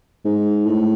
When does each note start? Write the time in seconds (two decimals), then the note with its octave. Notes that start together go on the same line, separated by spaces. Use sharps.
0.25 G#2
0.66 A2